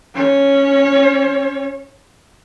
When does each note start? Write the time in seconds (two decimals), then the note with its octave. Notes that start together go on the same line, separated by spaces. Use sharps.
0.15 C#4 C#5